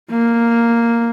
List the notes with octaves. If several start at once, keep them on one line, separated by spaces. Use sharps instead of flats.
A#3